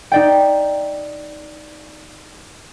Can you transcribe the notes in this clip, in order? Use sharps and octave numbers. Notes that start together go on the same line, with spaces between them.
D#4 D5 G5